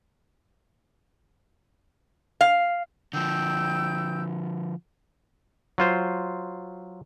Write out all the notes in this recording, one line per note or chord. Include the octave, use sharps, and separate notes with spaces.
F5
D3 F3 G5 E6 G6
F#3 F4 C5